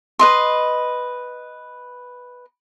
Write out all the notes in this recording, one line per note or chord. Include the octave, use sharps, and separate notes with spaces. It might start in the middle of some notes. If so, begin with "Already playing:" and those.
B4 D#5 C6